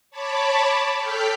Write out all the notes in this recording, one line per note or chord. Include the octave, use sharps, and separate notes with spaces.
C#5 A5 B5 D6
A4 G5 F6 G6 B6